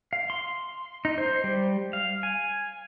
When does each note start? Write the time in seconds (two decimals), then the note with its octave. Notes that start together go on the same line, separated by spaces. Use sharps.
0.13 F5
0.30 C6
1.05 D#4
1.18 C5
1.44 G3
1.93 F5
2.23 G#5